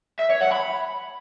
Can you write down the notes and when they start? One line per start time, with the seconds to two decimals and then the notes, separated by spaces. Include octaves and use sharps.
0.19 E5
0.30 C#5
0.41 F#5
0.52 B5